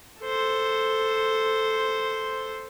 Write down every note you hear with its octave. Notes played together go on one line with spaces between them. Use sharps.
A4 C5